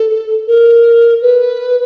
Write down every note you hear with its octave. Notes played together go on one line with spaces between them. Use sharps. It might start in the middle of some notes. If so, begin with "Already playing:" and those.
Already playing: A4
A#4
B4